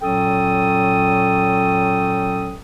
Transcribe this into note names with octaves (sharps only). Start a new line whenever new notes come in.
A#2 F#3 C#4 A4 G5 D#6